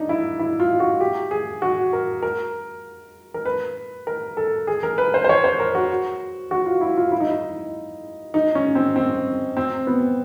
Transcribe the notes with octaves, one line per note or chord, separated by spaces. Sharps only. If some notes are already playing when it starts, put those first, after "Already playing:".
Already playing: D4 D#4
E4
E4
F4
F#4
G4
G#4
F#4
A#4
A#4
A#4
B4
A#4
A4
G#4
A#4
B4
C5
C5
C#5
C5
A#4
F#4
F#4
F4
E4
F4
E4
D#4
E4
D#4
C#4
C4
C4
C4
B3